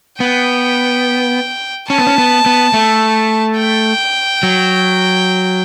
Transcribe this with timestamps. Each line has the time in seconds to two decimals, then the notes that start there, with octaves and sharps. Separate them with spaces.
0.20 B3 G5
1.89 C#4 A5
1.98 B3
2.07 C#4
2.18 B3
2.46 B3
2.74 A3
3.58 G5
4.43 F#3